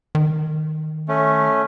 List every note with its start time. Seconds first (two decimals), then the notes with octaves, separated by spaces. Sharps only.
0.15 D#3
1.08 A3 C#4